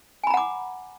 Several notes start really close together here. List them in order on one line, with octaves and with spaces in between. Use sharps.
G#5 B5 A#5 F#5 D6